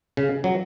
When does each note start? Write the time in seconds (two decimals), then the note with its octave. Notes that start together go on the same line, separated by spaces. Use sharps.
0.17 C#3
0.44 F#3